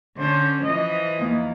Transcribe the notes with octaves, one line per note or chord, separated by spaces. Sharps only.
D3 C#4 C5
E3 F3 D#5
E2 D#3 A#3